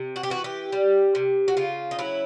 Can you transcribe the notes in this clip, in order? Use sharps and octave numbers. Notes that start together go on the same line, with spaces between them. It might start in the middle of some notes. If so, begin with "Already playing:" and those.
Already playing: C3
F#4
G4
E3 F#4
G4
G3
C3
F#4
C#3 F4
D#4
F#3 E4